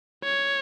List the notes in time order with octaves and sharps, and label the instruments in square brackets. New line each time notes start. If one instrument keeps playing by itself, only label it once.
[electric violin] C#5